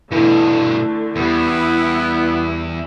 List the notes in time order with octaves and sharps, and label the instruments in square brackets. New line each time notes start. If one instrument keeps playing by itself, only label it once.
[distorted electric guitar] G2 B2 [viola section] D3 A3 [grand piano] E3
[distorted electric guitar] E2 [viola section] G3 E4 [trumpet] B3